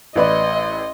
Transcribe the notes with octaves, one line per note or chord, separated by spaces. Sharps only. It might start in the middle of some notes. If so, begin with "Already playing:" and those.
A1 B4 D5 D#5 C6